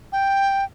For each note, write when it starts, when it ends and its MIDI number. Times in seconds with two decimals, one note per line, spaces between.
0.12 0.65 79